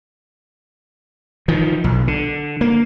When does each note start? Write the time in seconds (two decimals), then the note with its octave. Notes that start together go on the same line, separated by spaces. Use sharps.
1.48 D#3 F3
1.84 B1
2.08 D3
2.61 A#3